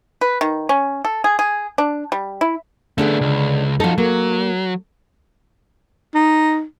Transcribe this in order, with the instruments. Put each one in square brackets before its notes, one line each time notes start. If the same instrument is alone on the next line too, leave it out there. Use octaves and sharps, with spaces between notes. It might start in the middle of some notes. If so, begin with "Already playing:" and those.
[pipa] B4
D#3
C#4
A4
G#4
G#4
D4
G3
E4
[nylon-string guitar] D3 D4 G#4 [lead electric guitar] A3 B3
[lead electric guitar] C#2
[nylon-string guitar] F3 A4 [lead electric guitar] D#4 F#4
[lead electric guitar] F#3 [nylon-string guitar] A#3
[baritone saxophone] D#4